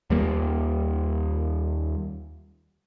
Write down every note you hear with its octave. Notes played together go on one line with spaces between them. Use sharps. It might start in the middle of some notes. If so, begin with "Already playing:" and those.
D#2 G3 A#3